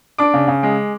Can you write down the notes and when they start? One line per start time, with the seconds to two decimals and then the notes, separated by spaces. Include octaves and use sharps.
0.18 D4 D6
0.34 C#3
0.48 C#3
0.63 G#3